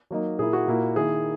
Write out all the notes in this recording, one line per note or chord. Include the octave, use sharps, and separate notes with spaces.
F#3 A#3 D#4
A#2 A#3 E4 G#4
F#4
A#2 A#3 E4
D#3 A#3 E4 G#4